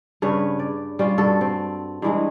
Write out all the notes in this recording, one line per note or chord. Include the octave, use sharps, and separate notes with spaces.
G2 C#3 B4 C#5
D5
G3 C#4 F4
G2 F#4 A4
C4
G2 E3 G#3